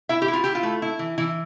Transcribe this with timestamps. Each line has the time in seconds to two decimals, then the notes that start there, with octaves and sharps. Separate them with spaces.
0.09 E4 E5
0.22 G4
0.28 E4
0.33 F4
0.44 E4 G4
0.55 F4
0.63 A3
0.82 E4
0.99 E3
1.18 E3 E4